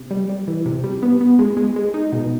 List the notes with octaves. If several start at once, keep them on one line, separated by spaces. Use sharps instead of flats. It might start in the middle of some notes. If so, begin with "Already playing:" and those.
Already playing: C3
G3
G3
E3
C3
G3
B3
B3
G#3
G#3
G#3
D#4
B2